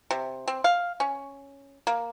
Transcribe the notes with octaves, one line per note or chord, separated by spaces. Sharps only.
C3
C4
F5
C#4
A#3